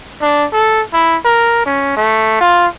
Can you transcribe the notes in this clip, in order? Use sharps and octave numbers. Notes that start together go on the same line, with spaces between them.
D4
A4
E4
A#4
C#4
A3
F4